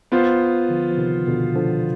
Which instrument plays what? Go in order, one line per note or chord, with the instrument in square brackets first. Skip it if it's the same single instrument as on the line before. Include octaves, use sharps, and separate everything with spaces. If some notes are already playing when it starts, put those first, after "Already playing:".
[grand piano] B3 F4 C5
[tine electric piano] D3 F3
F3
C3 D#3
B2 D3
D3 F3